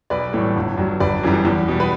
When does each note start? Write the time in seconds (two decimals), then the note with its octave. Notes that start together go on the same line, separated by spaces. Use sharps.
0.10 B1 B4 D5
0.33 A2 E3 G3 A4 C#5
0.56 G1
0.77 G2 F#3
1.00 G1 B4 D5
1.23 F#2 E3 G3
1.45 E2
1.68 B2 G3
1.80 B4